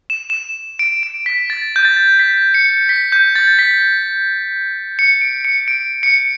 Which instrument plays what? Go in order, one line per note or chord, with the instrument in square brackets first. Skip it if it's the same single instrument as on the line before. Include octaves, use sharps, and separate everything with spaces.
[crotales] E7
E7
D7
D7
B6
A6
G6
A6
B6
C#7
B6
G6
A6
B6
C#7
D7
C#7
D7
C#7